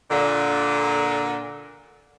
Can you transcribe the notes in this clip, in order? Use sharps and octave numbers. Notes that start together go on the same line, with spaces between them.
A#2 D3